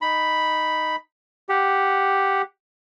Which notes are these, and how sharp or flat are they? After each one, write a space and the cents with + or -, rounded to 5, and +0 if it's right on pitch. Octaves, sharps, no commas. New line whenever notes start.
D#4 +0 B5 +0
G4 +0 F#5 +0